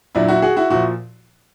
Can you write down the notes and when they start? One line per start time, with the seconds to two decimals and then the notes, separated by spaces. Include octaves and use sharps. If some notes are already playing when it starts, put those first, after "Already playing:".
0.15 A#2 F#3 D4 E4
0.28 E4 F#4
0.42 F#4 G#4
0.57 E4 F#4
0.70 A#2 F3 E4 F#4